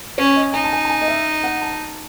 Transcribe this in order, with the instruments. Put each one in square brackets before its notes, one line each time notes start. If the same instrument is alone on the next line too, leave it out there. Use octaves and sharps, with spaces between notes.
[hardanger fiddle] C#4 [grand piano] C#5
[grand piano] D#5
[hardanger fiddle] D#4 [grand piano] G#5
[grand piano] A5
G#5
A5
G#5
D#5
E5
F#5
A5